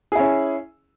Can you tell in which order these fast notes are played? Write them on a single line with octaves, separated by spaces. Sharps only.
G#4 E4 C#4